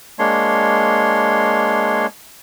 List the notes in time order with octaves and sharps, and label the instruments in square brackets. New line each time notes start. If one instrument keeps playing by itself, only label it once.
[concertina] G#3 A#3 D4 C#5 C6